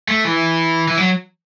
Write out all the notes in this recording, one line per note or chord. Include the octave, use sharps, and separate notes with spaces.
A3
E3
E3
F#3